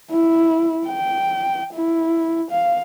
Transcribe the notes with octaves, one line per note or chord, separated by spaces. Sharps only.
E4
G5
E4
F5